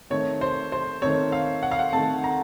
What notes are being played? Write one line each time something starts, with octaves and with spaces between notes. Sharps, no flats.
D#3 A3 C4 C#5
C5
C5
D#3 A3 C4 C#5
F5
F#5
F5
F#5
D#3 A3 C4 A5
A#5